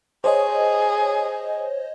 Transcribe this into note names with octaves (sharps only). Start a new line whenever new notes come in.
G#4 C5 C#5 D#5